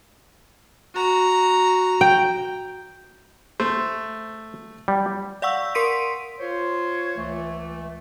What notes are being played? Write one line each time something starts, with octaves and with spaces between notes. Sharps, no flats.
F#4 A#5
G5
A3 C5
G3
D5 F5 F#5 C#6 E6
A#4 C6 B6 D7 D#7
F4 C5 C#5
C#2 E3 A3